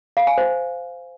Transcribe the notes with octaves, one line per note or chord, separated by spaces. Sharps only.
F5
G#5
C5